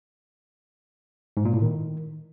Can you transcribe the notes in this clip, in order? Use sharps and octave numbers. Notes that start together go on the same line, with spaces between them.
G#2
A#2
A2
D#3